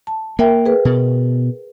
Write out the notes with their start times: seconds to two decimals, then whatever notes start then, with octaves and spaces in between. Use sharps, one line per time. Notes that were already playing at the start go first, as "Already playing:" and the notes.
0.07 A5
0.39 A#3 A#4 E5 G5
0.66 G#4 B4
0.85 B2